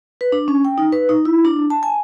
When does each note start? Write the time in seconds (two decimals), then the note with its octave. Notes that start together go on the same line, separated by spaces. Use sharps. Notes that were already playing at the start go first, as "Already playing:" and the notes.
0.21 B4
0.32 D4
0.48 C#4
0.65 G5
0.78 D#4
0.92 B4
1.09 D#4
1.25 E4
1.45 D4
1.70 A5
1.83 G#5